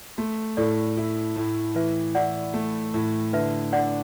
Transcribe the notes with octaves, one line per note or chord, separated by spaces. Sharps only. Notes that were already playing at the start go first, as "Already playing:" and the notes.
A3 F#4
A2 A4 D5
E4
A2
E3 B4 E5
E4 D5 F#5
A3
A2
D3 B4 E5
D4 D5 F#5